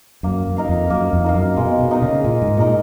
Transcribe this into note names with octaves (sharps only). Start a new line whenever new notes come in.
F#2 A#3
F#2
D#4 A#4 F5
F2
F#2 A#3
F2
D#4 A#4 F5
F#2
B2 G#3
B2
D#4 A#4 D#5
C#3
A#2 G#3
G#2
A#2 D#4 A#4 D#5